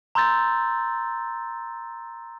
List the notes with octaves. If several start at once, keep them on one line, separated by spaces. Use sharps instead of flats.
A#5 C6 E6 G6 A6